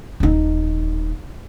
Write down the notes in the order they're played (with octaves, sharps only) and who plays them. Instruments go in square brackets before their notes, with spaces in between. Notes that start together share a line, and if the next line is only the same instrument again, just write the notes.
[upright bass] D#1 D#4